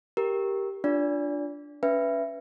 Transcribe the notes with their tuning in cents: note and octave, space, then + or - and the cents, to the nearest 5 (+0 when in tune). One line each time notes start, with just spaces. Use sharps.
G4 +0 A#4 +0
D4 +0 F4 +0 D5 -30
C#4 +30 B4 +0 E5 +20